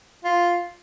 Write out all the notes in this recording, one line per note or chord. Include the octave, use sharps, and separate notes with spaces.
F4